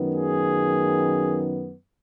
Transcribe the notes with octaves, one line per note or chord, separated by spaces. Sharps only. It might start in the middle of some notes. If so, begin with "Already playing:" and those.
Already playing: F#2 D#3 B3
G#4